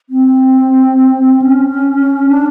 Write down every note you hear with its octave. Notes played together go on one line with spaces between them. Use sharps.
C4
C#4
D4